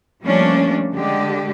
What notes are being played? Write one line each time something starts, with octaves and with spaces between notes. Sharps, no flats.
F3 G3 A3 A#3 C#4 D4
D3 G#3 G4